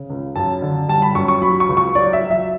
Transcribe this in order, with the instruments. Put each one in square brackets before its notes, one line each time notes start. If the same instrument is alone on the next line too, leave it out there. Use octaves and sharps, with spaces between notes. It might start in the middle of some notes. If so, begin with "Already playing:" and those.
Already playing: [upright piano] C#3
C#2
F#2 A5
D3
G3 A5
B5
F#2 C#6
C#6
F#3 B5
C#6
C#2
C#6
F#3 D5
E5
F#3
E5